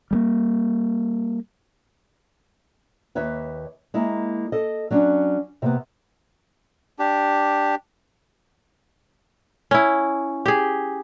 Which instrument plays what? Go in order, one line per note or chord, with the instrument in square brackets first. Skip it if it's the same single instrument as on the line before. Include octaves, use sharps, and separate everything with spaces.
[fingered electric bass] G3 G#3 A#3
[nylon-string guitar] D#2 B4 C#5 E5
G#3 A#3 E4
A4 D#5
F#3 C#4 D4
C3 A#3 B3
[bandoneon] D4 G4
[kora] C#4 E4
G4 G#4